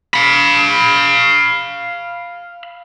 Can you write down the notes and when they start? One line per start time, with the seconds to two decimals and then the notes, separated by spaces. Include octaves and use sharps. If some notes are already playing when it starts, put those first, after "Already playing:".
0.14 F5 B5